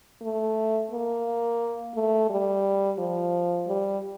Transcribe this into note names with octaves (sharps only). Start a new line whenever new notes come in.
A3
A#3
A3
G3
F3
G3